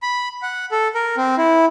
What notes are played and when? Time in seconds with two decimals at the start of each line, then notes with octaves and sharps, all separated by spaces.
0.02 B5
0.42 F#5
0.72 A4
0.95 A#4
1.17 C4
1.38 E4